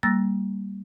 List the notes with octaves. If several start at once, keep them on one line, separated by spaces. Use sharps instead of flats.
G3 A#3 E6 F#6 A6 A#6